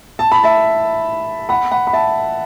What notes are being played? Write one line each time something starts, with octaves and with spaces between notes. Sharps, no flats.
A5
B5
E5 A5
F#5 B5
F#5 B5
B5
E5 A5